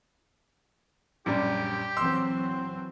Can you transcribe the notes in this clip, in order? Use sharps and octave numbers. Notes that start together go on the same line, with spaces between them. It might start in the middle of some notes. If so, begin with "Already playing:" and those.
A#1 F#2 G3 G4
E3 F#3 C4 C6 E6